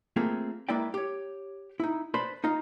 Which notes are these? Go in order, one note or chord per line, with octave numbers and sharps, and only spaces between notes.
A3 A#3 C4 F4 G#4
G#3 A#3 E4 B4 D5 G5
G4 C#5
D#4 E4
B4 C5 D5 A5 B5 C6
D#4 F4 D#5